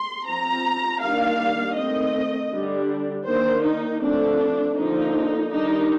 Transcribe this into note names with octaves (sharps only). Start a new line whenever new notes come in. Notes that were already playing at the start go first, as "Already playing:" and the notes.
Already playing: C6
F3 C4 A#5
D#3 G3 A#3 D4 F5
D#3 A3 C4 D#5
D3 G3 D4
D#3 A#3 D4 C5
D#4
F3 A3 C4 D4
D3 F3 A#3 D4 D#4
D#3 G3 D4 D#4